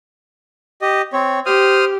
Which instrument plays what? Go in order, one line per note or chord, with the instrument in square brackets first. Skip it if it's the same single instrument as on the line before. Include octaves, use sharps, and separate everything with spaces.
[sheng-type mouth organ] G4 D#5
C4 C#5
[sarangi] G4 [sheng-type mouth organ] C5 D#6 F6